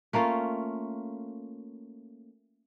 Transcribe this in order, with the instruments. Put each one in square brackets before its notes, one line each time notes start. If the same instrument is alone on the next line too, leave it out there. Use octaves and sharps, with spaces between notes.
[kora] A3 A#3 C#4 F4